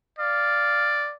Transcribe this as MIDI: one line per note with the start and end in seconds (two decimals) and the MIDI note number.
0.19 1.14 74
0.19 1.10 77